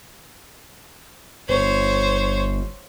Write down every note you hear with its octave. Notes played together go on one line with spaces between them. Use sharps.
G1 C5 C#5